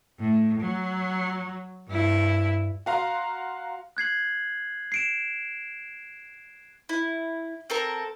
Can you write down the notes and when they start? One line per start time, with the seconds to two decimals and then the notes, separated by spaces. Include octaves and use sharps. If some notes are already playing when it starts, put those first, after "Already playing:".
0.19 A2
0.60 F#3
1.88 G2 E4
2.86 F#4 F5 A#5 C6
3.97 F#6 G#6 C7 F#7
4.92 C7 D7 E7
6.89 E4
7.70 C4 A4 A#4